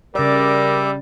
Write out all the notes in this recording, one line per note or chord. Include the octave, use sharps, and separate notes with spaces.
C#3 G3 A#4 D5 E5 D6